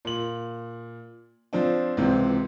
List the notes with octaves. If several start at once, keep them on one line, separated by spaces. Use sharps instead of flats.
A#2 F#7
F3 C4 D4
C#2 C3 E3 C4